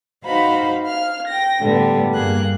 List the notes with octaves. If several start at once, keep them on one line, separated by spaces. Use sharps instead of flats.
D#4 F#4 B4 C5 F5 B5
F5 F6
G5 A#6
A2 D3 G3 B3
G2 A#3 G#4 F#6